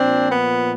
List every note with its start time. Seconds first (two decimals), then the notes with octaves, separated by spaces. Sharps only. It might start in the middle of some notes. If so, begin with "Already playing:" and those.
Already playing: A#2 F3 C4 D4
0.32 B3